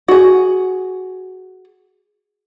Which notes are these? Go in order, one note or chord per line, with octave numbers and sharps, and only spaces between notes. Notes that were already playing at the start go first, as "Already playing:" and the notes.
F#4 G#4